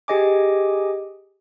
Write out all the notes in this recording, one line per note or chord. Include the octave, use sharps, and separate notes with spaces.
G4 G#4 D#5 G#5 D6